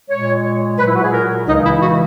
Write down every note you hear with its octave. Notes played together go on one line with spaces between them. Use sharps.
A#2 G#3 C#5
A#2 F#3 B4
E4
F#4
G#4
A#4
C#2 C#3 E3 D#4
E4
F#4